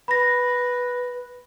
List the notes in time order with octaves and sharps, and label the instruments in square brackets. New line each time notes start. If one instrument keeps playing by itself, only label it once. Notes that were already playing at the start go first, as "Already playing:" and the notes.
[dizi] B4 [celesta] B5 A#6